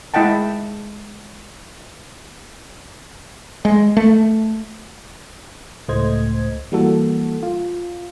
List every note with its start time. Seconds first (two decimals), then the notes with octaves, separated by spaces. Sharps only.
0.14 G#3 E4 D#5 F#5 G5 A5
3.65 G#3
3.97 A3
5.88 C#2 A2 A3 C5 D#5 G#6
6.72 E3 G3 A#3 F#4 A4
7.43 F4